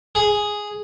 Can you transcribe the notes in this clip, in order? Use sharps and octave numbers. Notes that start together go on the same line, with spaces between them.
G#4